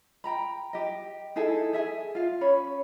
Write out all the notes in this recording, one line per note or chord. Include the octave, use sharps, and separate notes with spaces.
G5 A#5 B5
G4 D#5
D#4 E4 G#4 A4
G#4 E5 G#5
F4 F5
C#4 C#5 B5